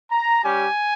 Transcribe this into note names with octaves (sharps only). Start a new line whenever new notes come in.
A#5
G3 C#4 G4 G#5